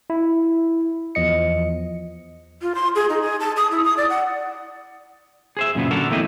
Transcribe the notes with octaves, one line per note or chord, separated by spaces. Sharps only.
E4
E2 F3 D#5 C#7
F4
C6
G#4
D#4
G#4
A5
D#6
E4
D#6
D5
F#5
G#4 C5 E5
F#2 A#2 C#3 B3
D3 F#4 A4 A#4
E2 A3 C4 E4 D#5